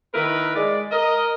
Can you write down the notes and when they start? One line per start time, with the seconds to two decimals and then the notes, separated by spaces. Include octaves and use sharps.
0.14 D#3 E4 A#4 B4
0.56 G#3 D5
0.92 A#4 D#5